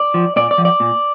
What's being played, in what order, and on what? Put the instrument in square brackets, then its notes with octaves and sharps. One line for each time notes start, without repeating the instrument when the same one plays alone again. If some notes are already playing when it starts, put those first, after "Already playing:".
Already playing: [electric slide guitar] D5
F3
A#2 D5
D5
F3
D5
A#2